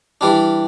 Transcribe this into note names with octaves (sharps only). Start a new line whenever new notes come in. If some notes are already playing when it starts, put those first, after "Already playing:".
E3 G3 D4